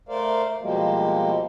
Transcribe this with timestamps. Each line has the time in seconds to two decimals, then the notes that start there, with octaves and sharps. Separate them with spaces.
0.09 A3 A#4 C5 D5 F5
0.61 B2 F3 G3 G#3 A#3